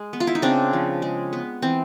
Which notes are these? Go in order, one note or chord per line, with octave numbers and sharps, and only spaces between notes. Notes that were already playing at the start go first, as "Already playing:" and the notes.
Already playing: G#3
B3
F4
E4
D#4
C#3 C4 D4
F3
G#3
B3
E3 C4